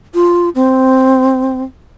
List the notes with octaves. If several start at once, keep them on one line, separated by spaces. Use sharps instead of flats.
F4
C4